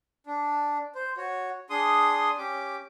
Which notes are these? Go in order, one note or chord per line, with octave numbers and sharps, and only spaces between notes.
D4
C5
F#4 C#5
D4 G#4 C6 D#6
C#4 G4 D6